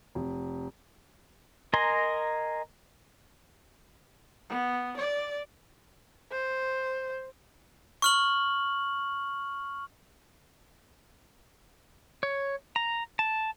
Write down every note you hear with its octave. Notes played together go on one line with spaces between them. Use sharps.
F1
A#4 D#5 G#5 A#5 C6
B3
D5
C5
C#6 F6 F#7
C#5
A#5
A5